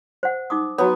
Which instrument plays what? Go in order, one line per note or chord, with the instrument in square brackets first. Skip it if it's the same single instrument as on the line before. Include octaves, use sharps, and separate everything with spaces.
[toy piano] C5 F#5
D#4 D6 D#6
[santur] F#3 B3 [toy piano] F#4 C#5